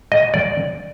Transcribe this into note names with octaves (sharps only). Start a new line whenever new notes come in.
D#5
D5